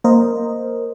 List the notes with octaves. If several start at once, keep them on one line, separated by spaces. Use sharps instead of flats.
A#3 A#4 C5 D#5